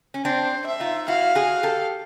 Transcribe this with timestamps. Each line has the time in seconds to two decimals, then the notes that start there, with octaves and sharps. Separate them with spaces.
0.14 C#4
0.24 C4 D4 C5
0.67 E5
0.80 D#4 F4
1.08 E4 F#4 F5
1.35 F#4 G#4
1.63 G4 A4